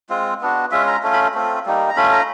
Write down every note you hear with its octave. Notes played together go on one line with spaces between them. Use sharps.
G#3 C4 F4
B3 D4 F#4
G#3 C#4 F4 E5
A#5
A3 C#4 F4
B5
A3 C4 F4
G3 A#3 D#4
A#5
A3 C#4 F4 B5
A#5